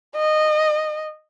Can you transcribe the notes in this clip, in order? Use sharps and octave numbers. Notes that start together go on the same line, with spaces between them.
D#5